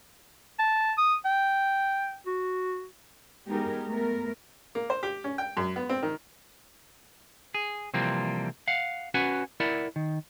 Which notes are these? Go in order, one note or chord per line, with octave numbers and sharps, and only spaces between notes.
A5
D#6
G5
F#4
G#3 B3 D#4 G4 G#4 A#4
A3 B3 A#4
A#3
C5
G4
C#4
G5
F#2
B3
C4
D#3
G#4
C3 E3 F3 G3 A#3 C4
F5 F#5
C#4 F#4 B4 F#5 G#5
E4 A#4 D5 E5 F#5
D#3